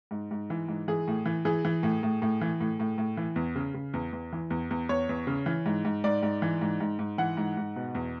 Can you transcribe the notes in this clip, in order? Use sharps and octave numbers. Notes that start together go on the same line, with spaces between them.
G#2
G#2
E3
G#2
E3 G#4
A2
E3
E3 G#4
E3
A2
A2
A2
E3
A2
A2
A2
E3
E2
C#3
C#3
E2
E2
E3
E2
E2
E2 C#5
E2
C#3
E3
G#2
G#2
G#2 D5
G#2
E3
G#2
G#2
G#2
E3 F#5
G#2
G#2
B2
E2